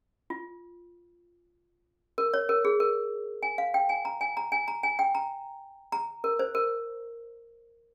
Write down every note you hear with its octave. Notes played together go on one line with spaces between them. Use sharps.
F4
A#4
C#5
A#4
G#4
A#4
G#5
F5
G5
G#5
A#5
G#5
A#5
G#5
A#5
G#5
G5
A#5
A#5
A#4
C5
A#4